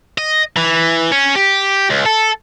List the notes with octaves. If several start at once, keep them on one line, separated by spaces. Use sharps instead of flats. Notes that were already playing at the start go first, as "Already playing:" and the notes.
D#5
E3
C#4
G4
C#2
A4